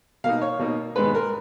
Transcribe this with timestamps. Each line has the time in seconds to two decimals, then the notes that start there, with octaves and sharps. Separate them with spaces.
0.24 B2 A#3 D#4 F5
0.41 C#5
0.59 B2 A#3 D#4
0.96 G#2 D#3 G#3 B3 B4
1.15 A#4